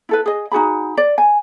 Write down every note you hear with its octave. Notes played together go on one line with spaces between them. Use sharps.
E4 A4 B4
G#4 D#5
D#4 F#4 G#4 B5
D5
G#5